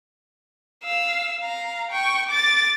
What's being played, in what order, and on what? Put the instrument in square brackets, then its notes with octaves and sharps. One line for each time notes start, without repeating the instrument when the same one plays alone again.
[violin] F5 E6
F5 A#5
G5 C#6
D6 A6